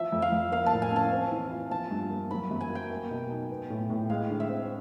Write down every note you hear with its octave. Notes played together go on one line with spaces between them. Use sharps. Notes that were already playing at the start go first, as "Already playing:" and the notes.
Already playing: F3 E5
F2
F5
F2
A#3 F5
A5
A2
G#5
C#4 A5
C4
E3
F4
F3 A5
G2
A#3
F#3 B5
F#2
G#5
A#3
G5
A#3
B2
D#4
B3
A2
A2
G#3 F5
D3
E5
C4